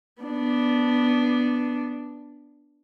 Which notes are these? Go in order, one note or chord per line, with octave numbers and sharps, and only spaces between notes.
B3 D4